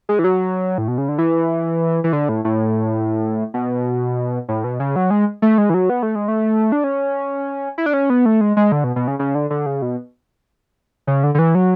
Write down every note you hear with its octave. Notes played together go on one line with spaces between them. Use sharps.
G#3
E3
F#3
A2
B2
C#3
D3
E3
E3
D3
A2
A2
B2
A2
B2
C#3
F#3
G#3
A3
G#3
E3
F#3
B3
A3
G#3
A3
D4
C#4
E4
D4
C#4
B3
A3
G#3
G#3
D3
B2
B2
C#3
C#3
D3
D3
C#3
B2
C#3
D3
D3
E3
F#3